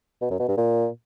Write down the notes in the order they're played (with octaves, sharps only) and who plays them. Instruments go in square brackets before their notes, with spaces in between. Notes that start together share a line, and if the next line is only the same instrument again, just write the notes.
[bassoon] B2
F#2
B2
G2
A#2